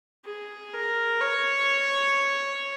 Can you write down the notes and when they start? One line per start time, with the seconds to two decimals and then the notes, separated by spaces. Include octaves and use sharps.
0.25 G#4
0.73 A#4
1.21 C#5